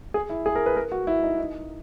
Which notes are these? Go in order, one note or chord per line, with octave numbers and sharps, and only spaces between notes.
G#4
E4
G#4
A#4
B4
A#4
F#4
E4
D#4
D#4